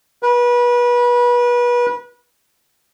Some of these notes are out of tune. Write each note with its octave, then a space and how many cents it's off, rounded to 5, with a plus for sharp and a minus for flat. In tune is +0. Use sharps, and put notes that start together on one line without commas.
B4 -30